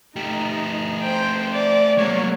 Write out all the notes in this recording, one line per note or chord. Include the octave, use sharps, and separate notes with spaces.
A3 D#4 G4
C5 G5
D5
F#3 G#3 A#3 C#5